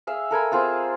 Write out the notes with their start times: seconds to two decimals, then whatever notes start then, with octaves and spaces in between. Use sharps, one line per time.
0.07 G#4 E5 F5
0.31 A4 A#4 G#5 B5
0.51 C4 F4 G#4 E6